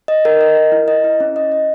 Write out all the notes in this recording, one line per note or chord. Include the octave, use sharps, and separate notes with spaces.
D#5
A#4
D#5
A#4
E4
D#5
E4
C#4
D#5
D#5